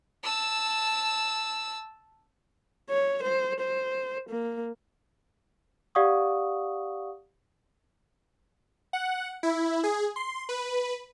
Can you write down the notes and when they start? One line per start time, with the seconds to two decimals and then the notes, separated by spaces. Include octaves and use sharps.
0.23 A5 E6
2.90 C#5
3.23 C5
3.60 C5
4.29 A#3
5.95 G4 D5 F5 F#5 C#6 D#6
8.93 F#5
9.43 E4
9.84 G#4
10.16 C6
10.49 B4